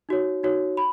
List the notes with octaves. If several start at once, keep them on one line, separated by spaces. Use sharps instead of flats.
D#4 F#4 C#5
D#4 F#4 C#5
B5